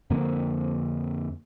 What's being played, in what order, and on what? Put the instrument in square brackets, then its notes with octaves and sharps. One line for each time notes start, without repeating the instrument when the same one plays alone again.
[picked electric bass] F2 D3 A#3 C4